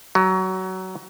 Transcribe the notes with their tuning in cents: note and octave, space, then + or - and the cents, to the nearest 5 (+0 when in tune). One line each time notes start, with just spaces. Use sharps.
F#3 +20